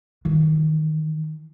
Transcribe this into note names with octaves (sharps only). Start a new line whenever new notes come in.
D#3 E3